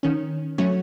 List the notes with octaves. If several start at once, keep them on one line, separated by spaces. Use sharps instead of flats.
D#3 C#4
F#3 A3 C#4 F#4 C#5